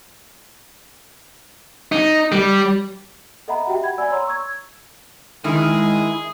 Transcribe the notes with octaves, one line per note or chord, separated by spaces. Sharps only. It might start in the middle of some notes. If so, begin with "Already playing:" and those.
D#4
G3
A4 D#5 E5 F#5 A#5 B5
F#4 G4 E5 F#5 G5
B5 G#6
D5 F#5 G#5 B5 E6
C#5 A#5 C6 E6
C#6 E6 G#6
D#3 G#3 E4 G#4